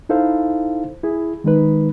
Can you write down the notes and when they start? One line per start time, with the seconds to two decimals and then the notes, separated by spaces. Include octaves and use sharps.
0.09 D#4 E4 A4 C5 F5
1.03 E4 G#4
1.44 D#3 G#3 D#4 B4